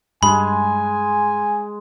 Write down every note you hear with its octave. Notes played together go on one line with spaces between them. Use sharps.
G2 G#3 G#5 B5